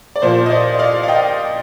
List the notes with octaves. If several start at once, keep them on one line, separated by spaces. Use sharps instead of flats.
D5
A#2 F3 A#3 C5
D#5
D5
D#5
D5 F5
F5
D#5 G5